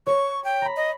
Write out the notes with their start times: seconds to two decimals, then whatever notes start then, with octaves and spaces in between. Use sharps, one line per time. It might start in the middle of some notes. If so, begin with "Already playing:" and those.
0.07 C#5 C#6
0.44 G5
0.62 A#5 B5
0.77 D#5